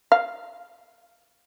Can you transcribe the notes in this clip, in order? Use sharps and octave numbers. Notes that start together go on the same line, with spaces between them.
F5